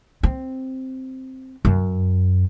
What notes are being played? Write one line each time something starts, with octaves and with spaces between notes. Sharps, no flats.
C4
F#2